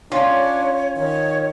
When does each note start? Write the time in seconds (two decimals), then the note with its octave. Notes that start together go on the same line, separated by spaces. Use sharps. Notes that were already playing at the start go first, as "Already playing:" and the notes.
0.12 C#4 D4 F4 C#5
0.97 D#3 C#5